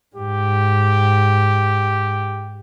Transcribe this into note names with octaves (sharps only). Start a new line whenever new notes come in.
G#2 G4